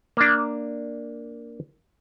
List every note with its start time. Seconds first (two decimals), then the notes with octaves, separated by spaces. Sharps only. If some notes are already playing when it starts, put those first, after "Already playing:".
0.17 A#3 D4